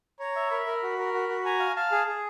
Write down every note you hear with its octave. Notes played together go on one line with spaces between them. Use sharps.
C#5 A#5
E5
A#4 B5
A#4
F#4
A#4
F#4
F#4
G#5 A#5
F5
F5 A5
G#4
G#4